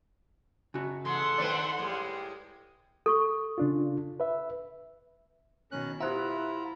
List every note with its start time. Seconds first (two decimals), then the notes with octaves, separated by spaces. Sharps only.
0.74 C#3 F#4
1.05 E2 G#3 A3 A4 F#5 C6
1.38 D#3 A3 C4 B4 D5
1.79 A2 G3 G#3
3.06 A4 C#6
3.58 C#3 D4 F4
4.20 B4 E5
5.72 B2 D#3 C#4 F#6
6.01 E4 F4 G4 C5 E5 F#5 A#5 F#6